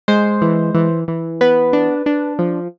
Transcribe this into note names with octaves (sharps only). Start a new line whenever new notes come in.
G#3 C5
E3
E3
E3
B3 B4
D4
D4
F3